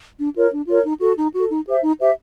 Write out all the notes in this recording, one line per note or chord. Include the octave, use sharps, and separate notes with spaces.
D4
F4 A#4 C#5
D4
F4 A#4 C#5
D#4
F#4 A4
D#4
F#4 A4
D#4
G4 C5 E5
D#4
G4 C5 E5